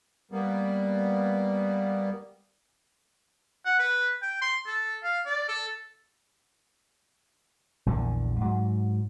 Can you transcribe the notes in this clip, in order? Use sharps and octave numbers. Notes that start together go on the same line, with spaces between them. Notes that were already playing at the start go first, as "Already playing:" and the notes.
G3 A#3 B3
F#5
B4
G5
C6
A4
F5
D5
A4
A#1 E2 D3
G#2 F#3